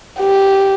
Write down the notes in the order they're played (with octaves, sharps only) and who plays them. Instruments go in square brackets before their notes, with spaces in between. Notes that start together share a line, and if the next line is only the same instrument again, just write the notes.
[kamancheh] G4